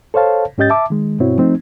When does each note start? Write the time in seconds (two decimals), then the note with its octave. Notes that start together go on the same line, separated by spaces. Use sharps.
0.14 A4 C5 C#5 F5 A5
0.58 G#2 C#4 G4 D#5 G6 A6
0.70 E5 A5 D6
0.90 D#3 G#3
1.20 G2 B2 C4 E4 F#4 C#5
1.38 F3 A3 C4 D#4